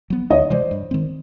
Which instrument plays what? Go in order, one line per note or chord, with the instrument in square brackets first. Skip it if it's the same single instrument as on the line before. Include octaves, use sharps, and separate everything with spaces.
[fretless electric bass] F#3 B3
[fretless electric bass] D2 [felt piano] C#5 D#5
[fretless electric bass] C3 E3 G#3 [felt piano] C5 D5
[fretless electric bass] G2
D#3 G#3 C4